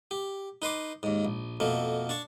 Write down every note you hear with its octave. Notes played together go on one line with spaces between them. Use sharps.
G4
D#4 B4 C6 D6
D#2 G#2
A#1
F2 B2 A3 A#3
D4 A5 C#6